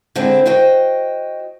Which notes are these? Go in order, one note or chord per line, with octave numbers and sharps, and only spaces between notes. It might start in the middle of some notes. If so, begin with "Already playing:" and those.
D3 G#3 C4 D4 E4
F#4 C5 D#5 G5